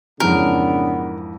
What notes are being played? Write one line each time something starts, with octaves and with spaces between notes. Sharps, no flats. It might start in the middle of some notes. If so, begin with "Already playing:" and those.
F2 G#2 C#3 E3 B3 D4 A#4